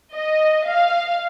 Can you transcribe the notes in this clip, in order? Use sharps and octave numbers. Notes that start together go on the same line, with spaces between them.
D#5
F5